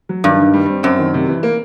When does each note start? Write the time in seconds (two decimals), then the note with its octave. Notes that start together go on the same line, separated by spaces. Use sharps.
0.09 F#3
0.24 G2 D#3
0.38 D#3
0.54 G3
0.69 C4
0.83 F#2 C4
0.99 D#3
1.14 C3
1.29 E3
1.43 A#3